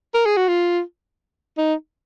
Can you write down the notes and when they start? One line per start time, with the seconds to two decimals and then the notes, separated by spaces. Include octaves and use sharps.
0.14 A#4
0.26 G#4
0.37 F#4
0.48 F4
1.58 D#4